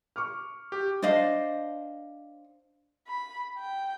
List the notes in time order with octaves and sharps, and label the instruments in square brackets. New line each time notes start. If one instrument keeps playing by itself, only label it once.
[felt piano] C#6 D6 F6
[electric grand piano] G4
[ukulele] D4 C5 D#5 F5
[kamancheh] B5
G5